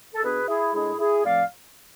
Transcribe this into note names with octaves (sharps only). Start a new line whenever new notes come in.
A4
B2 B3 D4 G#4 B4
E4 G#4
A2 G#3 D4 E4 G#4
E4 G#4
A2 F3 A3 C4 D5 F5